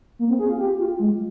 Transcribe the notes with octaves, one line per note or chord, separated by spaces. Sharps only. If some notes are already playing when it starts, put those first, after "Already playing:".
A#3
C4
G#4
F4
G4
F4
G#3